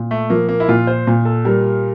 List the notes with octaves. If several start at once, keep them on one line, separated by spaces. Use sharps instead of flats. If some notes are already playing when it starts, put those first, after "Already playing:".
Already playing: A#2
A3
F3 A#3
A#3
E4
A#2 F4
C5
A#2
A4
G3 A#4